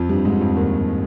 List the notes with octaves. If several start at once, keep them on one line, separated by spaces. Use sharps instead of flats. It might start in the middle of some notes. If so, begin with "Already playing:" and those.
Already playing: F2 F3
G2 G3
G#2 G#3
F2 F3
D#2 D#3